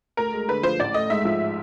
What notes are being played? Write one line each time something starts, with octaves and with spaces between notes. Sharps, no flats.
D2 A#4
G#3
D3 B4
F3 C5
A1 D5
A3 D#5
G#2 E5
F3